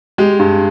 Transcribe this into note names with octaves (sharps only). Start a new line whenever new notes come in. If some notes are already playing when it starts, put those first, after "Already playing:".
G#3 G4
G2